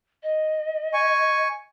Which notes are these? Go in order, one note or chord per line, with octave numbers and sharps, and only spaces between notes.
D#5
G#5 C#6